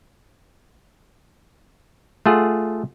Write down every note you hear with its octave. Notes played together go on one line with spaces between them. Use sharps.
A3 F4 G#4 F#5